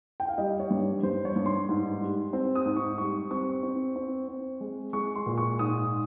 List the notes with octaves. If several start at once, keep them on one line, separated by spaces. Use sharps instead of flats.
G5
F5
G3 D#5
C#5
G2
G2 C5
C#5
G2
C6
G#2
G3
C4
D#6
G#2
C#6
G3 C#6
C4 C#6
C4
C4
C4
G#3
G#3 C#6
C6
A#2
C#6
G#2 D#6